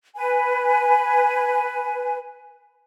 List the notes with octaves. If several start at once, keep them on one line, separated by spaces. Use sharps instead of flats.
B4 G#5